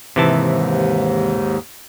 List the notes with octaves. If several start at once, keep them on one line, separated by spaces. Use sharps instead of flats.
D#2 G#2 C3 E3 A5